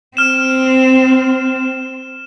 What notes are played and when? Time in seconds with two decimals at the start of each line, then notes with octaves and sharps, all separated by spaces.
0.17 C4 F6 E7